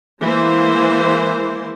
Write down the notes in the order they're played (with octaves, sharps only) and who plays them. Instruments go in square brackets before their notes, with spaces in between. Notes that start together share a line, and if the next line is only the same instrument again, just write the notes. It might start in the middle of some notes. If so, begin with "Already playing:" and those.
[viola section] E3 G#3 A#3 C5